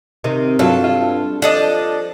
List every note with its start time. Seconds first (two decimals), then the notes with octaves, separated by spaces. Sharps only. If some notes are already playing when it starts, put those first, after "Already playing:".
0.24 C3 D#3
0.59 G2 F#3 F4 A4
0.84 F4
1.42 F3 D4 A4 D#5